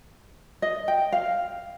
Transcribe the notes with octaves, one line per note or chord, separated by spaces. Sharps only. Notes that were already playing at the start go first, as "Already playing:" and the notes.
D#5
G5
F5